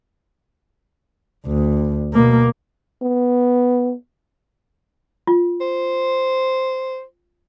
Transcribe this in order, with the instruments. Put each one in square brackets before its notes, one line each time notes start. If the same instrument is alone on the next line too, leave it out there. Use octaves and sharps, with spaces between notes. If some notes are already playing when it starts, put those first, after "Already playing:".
[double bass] D2
B2 A#3
[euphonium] B3
[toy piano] F4
[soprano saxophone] C5